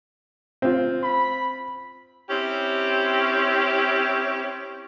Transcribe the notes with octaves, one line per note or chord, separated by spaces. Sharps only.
C4 F4
B5
C4 C#4 E4 G4